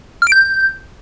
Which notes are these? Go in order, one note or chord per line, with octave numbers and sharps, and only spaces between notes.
F6
D7
G6